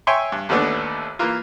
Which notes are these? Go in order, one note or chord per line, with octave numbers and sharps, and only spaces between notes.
C#5 E5 G5 G#5 C6 C#6
G2
A1 D#2 A3 B3 D4
E3 A#3 F4